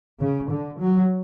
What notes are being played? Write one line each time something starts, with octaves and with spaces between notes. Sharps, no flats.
C#3
D3
F#3